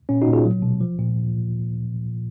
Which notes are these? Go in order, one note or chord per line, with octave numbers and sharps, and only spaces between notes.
A#2 C#4
D#4 F#4
A#2
F4 G#4
F#3
B2
F3
A#2